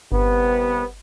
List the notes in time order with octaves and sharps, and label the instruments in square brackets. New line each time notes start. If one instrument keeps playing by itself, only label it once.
[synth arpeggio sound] G1 [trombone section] C2 C3 B3